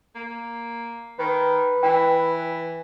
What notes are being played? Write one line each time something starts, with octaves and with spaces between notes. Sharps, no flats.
A#3
D#3 B4
E3 G5